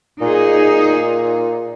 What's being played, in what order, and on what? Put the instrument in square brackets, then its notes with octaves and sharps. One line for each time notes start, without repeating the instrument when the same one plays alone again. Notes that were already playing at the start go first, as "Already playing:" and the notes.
[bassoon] A#2 [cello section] D#4 G#4